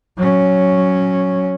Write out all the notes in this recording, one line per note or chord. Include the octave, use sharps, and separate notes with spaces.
F#3 C#4